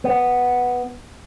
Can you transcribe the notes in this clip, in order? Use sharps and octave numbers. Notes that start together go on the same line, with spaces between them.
B3